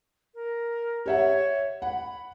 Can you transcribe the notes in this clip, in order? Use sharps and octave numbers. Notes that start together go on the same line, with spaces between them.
A#4
G4 C#5 E5 F#5
F#5 B5